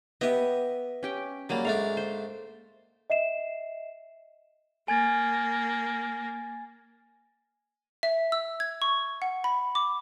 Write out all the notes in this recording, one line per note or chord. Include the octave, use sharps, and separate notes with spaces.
B3 G4 D#5 E5
C#4 G4 G5
F#3 G3 A#3 G#4
G#2 A3 D4 F5
C5
D#5 E5 C7 E7
A#3 G#5 G#6 A6
E5
E6
G#6
C#6
F#5
B5
D6